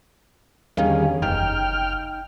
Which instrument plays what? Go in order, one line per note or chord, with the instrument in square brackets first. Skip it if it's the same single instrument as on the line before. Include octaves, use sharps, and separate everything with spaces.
[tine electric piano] E2 D3 [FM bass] D#3 [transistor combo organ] G3 C#4 G#4 [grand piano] F5
[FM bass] F#1 [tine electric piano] D#4 [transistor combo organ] G5 F6